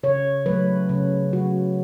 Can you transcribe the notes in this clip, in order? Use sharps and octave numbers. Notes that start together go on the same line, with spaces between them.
C#3 C#5
F#3 A3 B4
C#3
F#3 A3 F#4